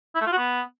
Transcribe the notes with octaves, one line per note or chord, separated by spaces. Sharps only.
E4
A3
F4
F#4
B3